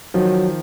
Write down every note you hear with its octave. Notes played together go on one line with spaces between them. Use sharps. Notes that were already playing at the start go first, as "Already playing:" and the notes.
D#3 F3 F#3